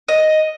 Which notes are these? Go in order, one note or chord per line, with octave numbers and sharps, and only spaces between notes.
D#5